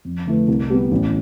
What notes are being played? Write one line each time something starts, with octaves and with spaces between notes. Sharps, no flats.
F2
D3 A3 E4 B4
C2
C3 G3 B3
A1